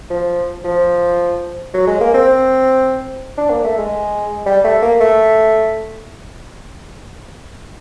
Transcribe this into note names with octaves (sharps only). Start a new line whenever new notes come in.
F3
F3
F#3
G#3
A#3
C4
D4
A#3
A3
G#3
G3
A3
A#3
A3